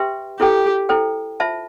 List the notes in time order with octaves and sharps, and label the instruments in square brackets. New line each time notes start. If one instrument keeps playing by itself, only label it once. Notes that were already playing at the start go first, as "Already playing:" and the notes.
Already playing: [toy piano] G4 B4 E5 G5 C6
[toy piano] E4 A4 C5 G5 [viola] G4
[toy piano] E4 A4 C5 G5
F4 C5 E5 A5